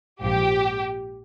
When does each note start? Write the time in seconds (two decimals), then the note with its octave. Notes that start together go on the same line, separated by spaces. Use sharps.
0.22 A#1 G#2 F3 G4